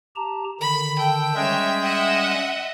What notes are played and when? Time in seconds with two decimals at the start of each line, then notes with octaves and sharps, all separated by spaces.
0.16 G4 A5 A#5
0.61 D3 D#3 B5
0.99 A4 G5
1.36 G3 G#3 C#4 C#5 E5
1.82 D#5 E5 F#5